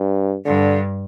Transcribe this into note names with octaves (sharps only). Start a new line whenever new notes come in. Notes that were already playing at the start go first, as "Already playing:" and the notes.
Already playing: G2
G2 D3